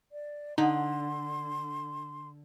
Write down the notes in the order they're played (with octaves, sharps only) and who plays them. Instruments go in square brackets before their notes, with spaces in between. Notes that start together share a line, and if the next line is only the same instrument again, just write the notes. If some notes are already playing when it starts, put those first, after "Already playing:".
[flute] D5
[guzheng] D3 [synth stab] D#4 [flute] C6